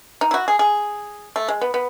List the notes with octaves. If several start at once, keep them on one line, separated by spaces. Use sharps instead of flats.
D#4
E4
F#4
G#4
G#4
A3
G#3
B3
B3